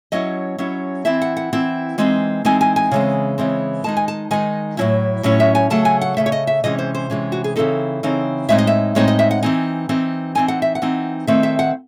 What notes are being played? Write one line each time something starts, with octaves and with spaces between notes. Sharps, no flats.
F#3 C#4 E4 D#5
F#3 C#4 E4
E3 C4 E4 E5
F#5
F#5
E3 C4 E4
E3 G#3 C4 D#4
E3 G#3 C4 D#4 G#5
G#5
G#5
C#3 E3 G#3 C4
C#3 E3 G#3 C4
D#3 G#3 D#4 A5
G#5
A5
D#3 G#3 D#4 G#5
A2 F#3 C#4 E4
A2 F#3 C#4 E4
E5
G#5
C#3 F#3 A3 A5
G#5
F#5
C#3 F#3 A3 E5
C#5
D#5
E5
C3 E3 G#3 C#4 D#5
C5
C5
C3 E3 G#3 C#4
F#4
G#4
C#3 E3 C4 D#4 A4
C#3 E3 C4 D#4
A2 G#3 C4 D#4 E5
D#5
E5
A2 G#3 C4 D#4 C#5
D#5
E5
F#5
E3 C4 D#4 G#5
E3 C4 D#4
E3 C4 D#4 G#5
F#5
E5
F#5
E3 C4 D#4
D#3 A3 C4 E4 E5
E5
F#5